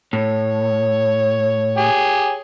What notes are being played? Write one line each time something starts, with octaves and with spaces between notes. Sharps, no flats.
A2 C#5
G4 G#4